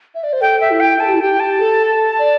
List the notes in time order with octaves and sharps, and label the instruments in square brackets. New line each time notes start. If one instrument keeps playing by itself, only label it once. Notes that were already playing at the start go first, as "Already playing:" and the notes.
[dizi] E5
D5
C5
[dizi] A4 [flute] G5
[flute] E5
[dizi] E4
[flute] G5
[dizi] A4 [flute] A5
[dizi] G4
E4
[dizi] G4 [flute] G5
[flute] A5
[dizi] A4
D5